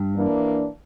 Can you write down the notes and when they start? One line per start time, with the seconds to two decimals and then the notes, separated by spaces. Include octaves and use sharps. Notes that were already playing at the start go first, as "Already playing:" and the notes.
Already playing: G2
0.14 E3 A#3 D4